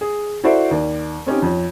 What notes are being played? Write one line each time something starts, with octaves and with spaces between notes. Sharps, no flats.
G#4
E4 F#4 A4 C5 D5 E5
D#2 D5
C4 C#4 D#4 G4
F2 C#5